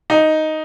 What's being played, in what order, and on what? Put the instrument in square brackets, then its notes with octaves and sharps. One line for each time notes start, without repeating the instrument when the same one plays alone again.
[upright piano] D#4